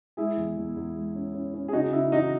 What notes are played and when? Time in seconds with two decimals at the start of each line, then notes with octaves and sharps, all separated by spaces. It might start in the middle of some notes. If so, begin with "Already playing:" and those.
0.17 G#3 E4 G#4
0.37 E2
0.57 E2
0.76 E2
0.95 G#3
1.15 C#4
1.34 C#4
1.54 C#4
1.68 G#4
1.73 C#3 D#4 F#4
1.92 C#3 E4
2.12 E3 D#4 F#4